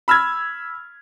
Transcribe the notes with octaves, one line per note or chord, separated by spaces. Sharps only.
B5 E6 F6 G#6